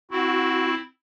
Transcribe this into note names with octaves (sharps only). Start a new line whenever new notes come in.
C4 E4 F#4